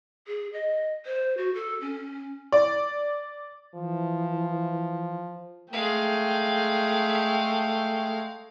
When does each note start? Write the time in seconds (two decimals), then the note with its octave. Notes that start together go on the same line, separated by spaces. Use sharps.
0.28 G#4
0.53 D#5
1.06 C5
1.37 F#4
1.54 A4
1.81 C#4
2.52 D5
3.74 E3 F3
5.72 G#3 A3 F5 G5